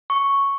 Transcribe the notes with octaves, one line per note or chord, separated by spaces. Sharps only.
C#6